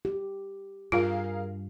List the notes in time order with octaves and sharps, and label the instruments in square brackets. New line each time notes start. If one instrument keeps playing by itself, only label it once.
[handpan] G4
[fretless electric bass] G2 [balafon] F4 [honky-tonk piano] G#4 A#4 F5